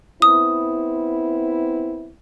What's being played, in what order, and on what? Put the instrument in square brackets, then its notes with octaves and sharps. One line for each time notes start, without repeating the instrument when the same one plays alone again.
[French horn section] B3 C4 E4 [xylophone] D#6